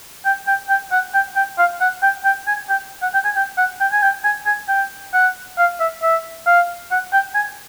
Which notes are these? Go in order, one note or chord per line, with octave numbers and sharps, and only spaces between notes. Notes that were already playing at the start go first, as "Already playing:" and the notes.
G5
G5
G5
F#5
G5
G5
F5
F#5
G5
G5
G#5
G5
F#5
G5
G#5
G5
F#5
G5
G#5
G5
G#5
G#5
G5
F#5
F5
E5
E5
F5
F#5
G5
G#5